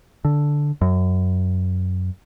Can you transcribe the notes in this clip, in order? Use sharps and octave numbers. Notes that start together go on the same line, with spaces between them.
D3
F#2